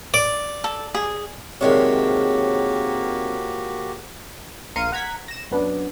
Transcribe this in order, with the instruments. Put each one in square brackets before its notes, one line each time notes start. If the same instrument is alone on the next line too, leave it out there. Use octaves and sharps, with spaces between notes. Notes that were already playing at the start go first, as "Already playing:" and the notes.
[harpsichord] D5
[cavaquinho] A4
G#4
[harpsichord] C3 D#3 [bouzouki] F3 G#3 C#5 [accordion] A#3 F#4 G4
[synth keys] A#1 A#4 F5 C6 C#7 D#7
F#5 A#5 G#6 B6
A#6 E7
F#2 B3 D4